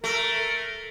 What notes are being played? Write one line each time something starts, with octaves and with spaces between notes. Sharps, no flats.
A3 A#4